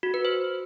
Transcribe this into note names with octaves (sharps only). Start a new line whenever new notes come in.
F#4
B4
C5